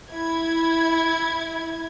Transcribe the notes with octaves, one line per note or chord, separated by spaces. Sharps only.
E4 G#6